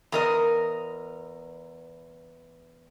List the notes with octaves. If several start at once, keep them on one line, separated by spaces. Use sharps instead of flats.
E2 A#4 D#5